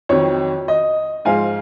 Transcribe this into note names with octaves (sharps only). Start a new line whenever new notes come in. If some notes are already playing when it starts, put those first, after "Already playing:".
F2 D#3 F#3 C#5
D#5
G#2 F3 G#3 F5 G#5